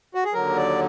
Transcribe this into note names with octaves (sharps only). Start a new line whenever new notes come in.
F#4
G#4
D#2 D3 F#3 A#4
D5